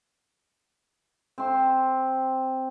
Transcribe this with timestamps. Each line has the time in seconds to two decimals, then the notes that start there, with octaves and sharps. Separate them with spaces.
1.38 C4 C6